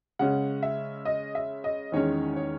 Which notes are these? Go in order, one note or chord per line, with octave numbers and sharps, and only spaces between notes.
C#3 G#3 C#4 F#5
E5
D#5
E5
D#5
E2 D#3 G#3 C#4 C#5
C#5